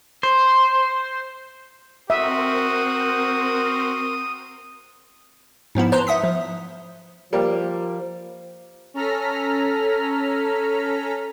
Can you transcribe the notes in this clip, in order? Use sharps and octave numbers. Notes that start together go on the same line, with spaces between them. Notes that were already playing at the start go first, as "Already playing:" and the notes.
C5
C4 F#4 A#4 C5 E5 D#6
G#2 F3 B3 E4
B4 C5 A5 A#5 C6
E5 F#5 D#6 B6
F3
F3 G3 A#3
C#4 A4 A#5 F6 B6